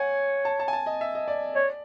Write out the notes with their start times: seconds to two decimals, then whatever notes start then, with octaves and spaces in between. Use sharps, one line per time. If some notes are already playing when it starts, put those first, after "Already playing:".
Already playing: C#5 F#5 G#5
0.45 A5
0.60 A5
0.68 G#5
0.73 A5
0.86 D#5
1.01 E5
1.15 D#5
1.28 D5
1.55 C#5 D5